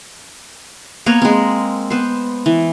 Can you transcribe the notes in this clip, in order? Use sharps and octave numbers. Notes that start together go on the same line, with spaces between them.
A#3 B3 A#4 C#5
G#3 C4
B3 C5
E3